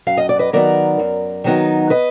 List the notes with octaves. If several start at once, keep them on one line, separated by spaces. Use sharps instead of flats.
F#2 F5
D#5
D5
B4 D#5
D#3 F#3 B3 D#4 A#4 D5
F#2
D#3 F#3 B3 D#4
B4 D#5